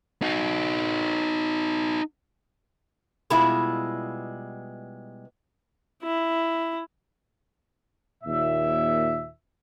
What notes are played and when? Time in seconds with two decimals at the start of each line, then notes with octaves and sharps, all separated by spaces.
0.22 D#4 F#4
3.30 B2 G3 G#3 B3 E4 F4
6.03 E4
8.23 D#2 A#2 E5